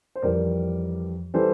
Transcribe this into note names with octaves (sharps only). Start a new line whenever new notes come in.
C5
F2 E3 G3 A#4 D5
E3 G3 A4 C5